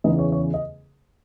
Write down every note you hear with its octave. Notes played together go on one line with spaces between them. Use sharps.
E2 C#3 E3 B3 D#4 D#5
C#5
C#5
D#5